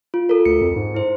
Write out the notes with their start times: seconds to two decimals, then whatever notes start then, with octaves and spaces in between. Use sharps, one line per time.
0.14 F4
0.29 A4 A#4
0.45 D2 C#7
0.61 F2
0.76 G#2
0.94 E4 C5